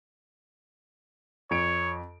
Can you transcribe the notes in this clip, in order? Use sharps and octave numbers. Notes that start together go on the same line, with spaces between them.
F2 C#5 D7